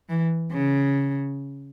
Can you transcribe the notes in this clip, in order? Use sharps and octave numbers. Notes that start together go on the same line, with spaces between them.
E3
C#3